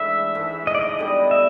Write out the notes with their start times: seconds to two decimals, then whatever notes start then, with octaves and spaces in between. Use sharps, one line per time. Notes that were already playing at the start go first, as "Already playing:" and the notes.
Already playing: G#2 E3 A3 D4 E5
0.35 G#2 E3 A3
0.67 D#5
0.75 D5
0.81 D#5
0.99 D3 G3 B3
1.31 E5